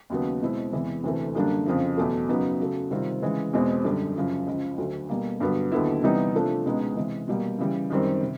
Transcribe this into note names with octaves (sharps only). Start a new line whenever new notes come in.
D#2 C#3 F#3 B3
B2 G#3 C4 E4
E2 C3 E3 G#3
D2 C3 E3 A3
F#2 D3 G3 A#3 D4
F2 C#3 F3
E2 B2 F#3 A3
F#2 C#3 F#3 B3 D#4
C#3 F#3 A3
C3 D#3 G3 C4 F4
C#3 E3 G#3
E2 B2 G#3 C4
F#2 D3 G3
F#2 C#3 F3
C#2 C#3 F3
D2 D3 F#3
B2 G3 A#3
G2 D3 F#3 B3
D#2 D3 F#3 B3 E4
C3 E3 G3 B3 D#4
C3 F3 A3 D4 F4
C#2 B2 G#3 B3 D#4
C3 E3 G#3
B2 G3 A#3
C#3 E3 G3
F#2 D#3 G3 C4
C3